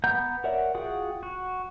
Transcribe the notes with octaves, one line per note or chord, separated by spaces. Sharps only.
B3 F#5 A#5 G6
A#4 C#5 D5 E5 F#5
F4 F#4 G#4 F#5 G5
F#4